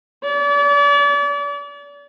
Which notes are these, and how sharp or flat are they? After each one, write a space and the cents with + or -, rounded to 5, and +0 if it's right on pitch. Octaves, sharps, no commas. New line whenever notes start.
D5 -40